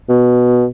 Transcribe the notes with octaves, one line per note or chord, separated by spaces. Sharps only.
B2